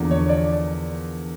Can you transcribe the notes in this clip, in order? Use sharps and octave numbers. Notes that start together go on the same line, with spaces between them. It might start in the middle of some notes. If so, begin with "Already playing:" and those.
Already playing: E2 D3 F3 A#3
C#5
D5